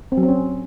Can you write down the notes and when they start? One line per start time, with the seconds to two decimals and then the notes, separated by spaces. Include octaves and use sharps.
0.12 C4
0.17 F#3
0.23 C4
0.29 C#4